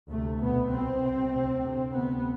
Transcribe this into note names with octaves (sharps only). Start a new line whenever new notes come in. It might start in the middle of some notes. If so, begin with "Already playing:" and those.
D2 C3 A3
C2 B2 B3
C2 B2 C4
C2 C3
D2 C3
D2 C3
D2 C3 B3